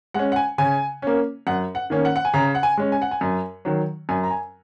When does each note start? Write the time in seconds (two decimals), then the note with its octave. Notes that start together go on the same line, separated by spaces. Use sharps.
0.14 G#3 C#4 F#5
0.32 F#5
0.36 G#5
0.58 C#3 G#5
1.02 A#3 C#4
1.47 F#2 F#5
1.75 F#5
1.90 D#3 A#3 C#4
2.05 F#5
2.16 F#5
2.25 G#5
2.33 C#3 A#5
2.55 F#5
2.63 G#5
2.78 G#3 C#4
2.92 G#5
3.02 F#5
3.11 G#5
3.21 F#2
3.65 D#3 F#3
4.09 F#2 G#5
4.24 A#5
4.31 G#5